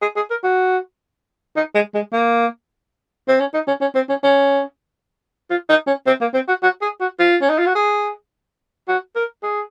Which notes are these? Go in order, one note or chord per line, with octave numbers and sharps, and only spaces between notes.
G#4
G#4
A#4
F#4
D#4
G#3
G#3
A#3
C4
C#4
D#4
C#4
C#4
C4
C#4
C#4
F4
D#4
C#4
C4
A#3
C4
F#4
F#4
G#4
F#4
F4
C#4
D#4
F4
F#4
G#4
F#4
A#4
G#4